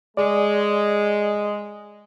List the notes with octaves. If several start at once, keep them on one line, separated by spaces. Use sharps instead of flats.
G#3 D5